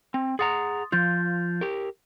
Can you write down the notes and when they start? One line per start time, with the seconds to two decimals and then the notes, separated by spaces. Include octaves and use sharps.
0.14 C4
0.39 G#4 F#5 A#5 C6 D#6 A6
0.92 F3 F4 G6 A6
1.61 G4 A#4